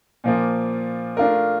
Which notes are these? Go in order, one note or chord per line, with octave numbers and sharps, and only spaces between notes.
A#2 F3 A#3
A3 D4 F4 A#4